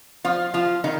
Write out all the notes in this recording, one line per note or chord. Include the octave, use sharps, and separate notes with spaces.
F3 F4
F3 F4
D#3 D#4